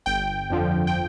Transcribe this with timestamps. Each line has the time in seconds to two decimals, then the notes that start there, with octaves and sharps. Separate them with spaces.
0.06 G1 G5
0.50 F2 D3 F3
0.87 G5